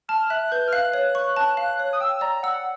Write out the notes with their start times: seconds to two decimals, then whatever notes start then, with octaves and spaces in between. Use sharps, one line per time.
0.08 A5 F6
0.30 E5 F#6
0.52 B4 G6
0.68 F6
0.73 F5 F#6
0.94 C#5
1.15 C#6
1.36 A5
1.57 F5
1.79 C#5
1.93 D#6
2.00 G5 E6
2.21 D5 A#5
2.43 F#5 E6